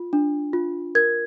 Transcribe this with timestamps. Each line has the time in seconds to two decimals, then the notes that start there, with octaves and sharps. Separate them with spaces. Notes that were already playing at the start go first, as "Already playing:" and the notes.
Already playing: F4
0.13 D4
0.53 F4
0.95 A#4 G#6